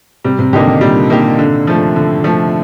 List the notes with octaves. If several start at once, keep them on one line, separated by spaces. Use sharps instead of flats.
C3 G3
C3
D3 A#3 D#4 G4
D#3
A#2 G3
A#3 D#4 G4
D3
F3 A3
D3
F3 A3